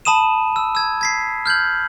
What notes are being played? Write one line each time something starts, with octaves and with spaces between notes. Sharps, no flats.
A5 B5 D#6 D#7 E7
E6
E6 G#6
G#6 B6 C7
F6 G6 G#6 F#7